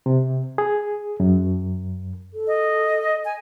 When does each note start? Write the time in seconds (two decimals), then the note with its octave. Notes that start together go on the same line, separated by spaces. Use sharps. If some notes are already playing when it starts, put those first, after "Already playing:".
0.06 C3
0.58 G#4
1.20 F#2
2.33 A4
2.47 D#5
3.25 G#5